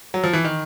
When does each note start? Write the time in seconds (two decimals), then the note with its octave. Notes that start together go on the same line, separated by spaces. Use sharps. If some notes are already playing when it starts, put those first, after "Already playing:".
0.14 F#3
0.24 F3
0.33 E3
0.44 D#3